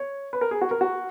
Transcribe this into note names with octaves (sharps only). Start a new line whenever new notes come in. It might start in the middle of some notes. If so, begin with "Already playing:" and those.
Already playing: C#5
B4
A#4
G#4
F#4
A#4
F#4